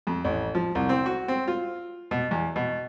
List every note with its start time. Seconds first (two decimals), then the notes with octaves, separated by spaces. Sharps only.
0.07 F2
0.24 A1
0.55 F3
0.75 C2
0.89 C4
1.06 F#4
1.28 C4
1.48 F4
2.11 B2
2.31 E2
2.56 B2